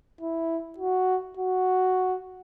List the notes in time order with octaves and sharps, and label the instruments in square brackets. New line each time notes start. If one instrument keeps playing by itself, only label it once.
[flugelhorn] E4
F#4
F#4